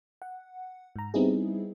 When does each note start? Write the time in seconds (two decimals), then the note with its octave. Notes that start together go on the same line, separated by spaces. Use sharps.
0.22 F#5
0.96 G#2 A#5
1.14 G3 B3 C4 D#4 E4 G#4